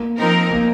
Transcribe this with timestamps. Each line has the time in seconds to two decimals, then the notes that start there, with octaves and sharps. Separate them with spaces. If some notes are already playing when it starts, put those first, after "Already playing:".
Already playing: A#3
0.17 F3 C4 D#4 A#4
0.51 A#3